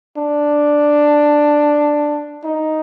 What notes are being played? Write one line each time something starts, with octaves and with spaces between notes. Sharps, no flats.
D4
D#4